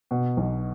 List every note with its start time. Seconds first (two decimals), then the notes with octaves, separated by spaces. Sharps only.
0.11 B2
0.37 B1